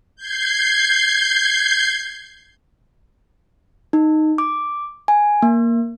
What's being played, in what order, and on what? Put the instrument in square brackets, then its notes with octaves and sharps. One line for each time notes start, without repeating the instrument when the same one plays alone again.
[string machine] G6 G#6 C7
[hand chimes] D#4
D6
G#5
A#3